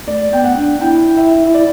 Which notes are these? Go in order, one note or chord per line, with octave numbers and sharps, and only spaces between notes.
A3 D5
B3 G5
F#5
D4
E4 G5
E5
D5